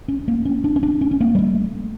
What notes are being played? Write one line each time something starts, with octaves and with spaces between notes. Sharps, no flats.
C#4
A#3
C#4
D4
C#4
D4
C#4
C#4
A#3
G3
A3